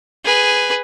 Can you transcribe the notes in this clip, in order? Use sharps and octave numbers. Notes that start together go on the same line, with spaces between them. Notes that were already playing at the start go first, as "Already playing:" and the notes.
G#4 B4